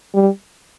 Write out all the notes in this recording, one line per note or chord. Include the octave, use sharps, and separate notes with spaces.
G3